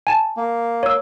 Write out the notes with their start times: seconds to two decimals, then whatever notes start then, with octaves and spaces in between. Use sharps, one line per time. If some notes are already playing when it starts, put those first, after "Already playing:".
0.07 G#5 A5
0.37 A#3
0.83 C#5 E6